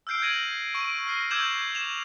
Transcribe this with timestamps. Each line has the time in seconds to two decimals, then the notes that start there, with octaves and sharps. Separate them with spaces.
0.07 E6 F6 G6 C7 D7
0.22 G6 G#6 A#6 D#7 F#7
0.75 C#6 D7 D#7
1.07 F6 A#6 C7
1.31 D6 E6 G6 G#6 E7 F#7
1.75 E7 F7